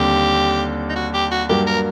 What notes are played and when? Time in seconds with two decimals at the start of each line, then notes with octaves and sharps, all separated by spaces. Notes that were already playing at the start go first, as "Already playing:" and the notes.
Already playing: D#2 D3 G3 C4 G4
0.89 D#4
0.96 F#4
1.14 G4
1.31 F#4
1.49 G2 F#3 A#3 G4
1.67 A#4